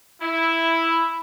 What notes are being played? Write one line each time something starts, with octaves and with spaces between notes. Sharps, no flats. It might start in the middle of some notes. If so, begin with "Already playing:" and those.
E4